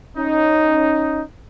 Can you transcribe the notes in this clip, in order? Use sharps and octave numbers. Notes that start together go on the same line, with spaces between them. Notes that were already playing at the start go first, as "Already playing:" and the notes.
C#4 D#4